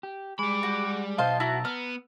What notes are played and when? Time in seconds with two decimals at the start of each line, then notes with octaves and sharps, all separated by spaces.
0.03 G4
0.39 G3 G#3 B5 D6
0.63 F#4
1.18 B1 C5 D#5 F5 A5
1.40 E4 F#4 A#5
1.65 B3 F6